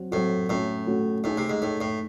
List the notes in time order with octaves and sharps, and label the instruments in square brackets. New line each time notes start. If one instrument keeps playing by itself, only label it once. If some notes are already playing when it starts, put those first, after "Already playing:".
Already playing: [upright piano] F#3 C4 F#4
[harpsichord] A2 [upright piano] F#3 C4 F#4
[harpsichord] A2 [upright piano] A3 C#4 F#4
[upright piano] A3 C#4 F#4
[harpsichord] A2 [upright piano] A3 D#4 G#4
[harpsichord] C3
G#2
[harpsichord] A2 [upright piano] A3 D#4 G#4
[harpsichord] A2